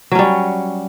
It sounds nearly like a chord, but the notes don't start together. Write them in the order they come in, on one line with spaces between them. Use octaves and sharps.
F#3 C#4 G3